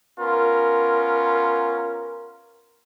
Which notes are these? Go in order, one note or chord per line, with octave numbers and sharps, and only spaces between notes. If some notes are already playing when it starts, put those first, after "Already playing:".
B3 C#4 F4 A#4